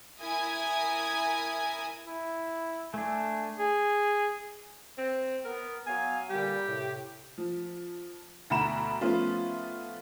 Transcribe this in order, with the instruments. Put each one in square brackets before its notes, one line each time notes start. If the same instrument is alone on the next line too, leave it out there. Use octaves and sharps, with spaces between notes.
[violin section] E4 A#4 G#5 D#6 G#6
[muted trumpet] E4
[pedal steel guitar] A3 D4 [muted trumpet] G#5
[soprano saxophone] G#4
[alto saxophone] C4
[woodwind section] B3 [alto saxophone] A#4
[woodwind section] F#3 B3 F5 [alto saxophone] G#5
[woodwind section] A#2 D3 G3 [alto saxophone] G4
[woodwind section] A2 C3
[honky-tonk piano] F3
D2 B2 F#5 A#5 B5 E7
F3 A3 B3 C#4 F4